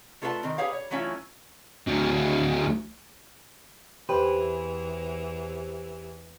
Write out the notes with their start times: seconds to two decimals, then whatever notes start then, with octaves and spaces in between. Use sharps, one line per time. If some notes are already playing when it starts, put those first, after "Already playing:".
0.22 A3 F4 A4 B4 E5 A5
0.43 D#3 C4
0.58 G4 G#4 B4 C#5 F5
0.73 C#5
0.91 E3 F#3 A3 C#4 E4 F4
1.87 D2 F#3
4.09 E2 E3 G4 B4 C5